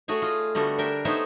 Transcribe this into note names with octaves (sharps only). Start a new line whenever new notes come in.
A3 F#4 G#4 C#5
F4 D#5
D3 G3 A3 B3 F#4 A4
D4 A#4 E5 G5
A3 B3 D#4 C5 C#5 E5